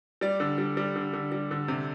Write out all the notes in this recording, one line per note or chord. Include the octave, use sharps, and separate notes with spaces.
G3 D5
D3
G3
G3
D3
D3
G3
D3
C3